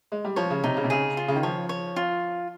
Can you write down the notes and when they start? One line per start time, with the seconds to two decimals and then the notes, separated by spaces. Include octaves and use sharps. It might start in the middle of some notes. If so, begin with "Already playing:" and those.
0.12 G#3
0.24 G3
0.36 F3 C#5
0.50 C#3
0.64 C3 D#4
0.77 C#3
0.84 C3
0.90 C#3 G#4
1.17 F4
1.28 C#3
1.36 D#3
1.43 F3 C#5
1.69 C#5
1.96 F4